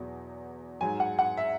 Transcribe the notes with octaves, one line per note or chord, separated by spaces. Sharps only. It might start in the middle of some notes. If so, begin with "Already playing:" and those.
Already playing: E2 B2 F#3
G#2 F#3 G#5
F#5
F#5
E5